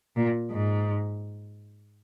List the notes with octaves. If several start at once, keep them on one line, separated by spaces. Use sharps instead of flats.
A#2
G#2